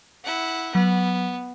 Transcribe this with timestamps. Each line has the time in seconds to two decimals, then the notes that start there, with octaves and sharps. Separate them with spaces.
0.24 E4 F#5
0.75 F#3 B3